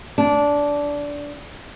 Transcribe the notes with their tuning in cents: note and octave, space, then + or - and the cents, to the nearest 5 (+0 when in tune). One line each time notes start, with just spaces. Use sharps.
D4 -15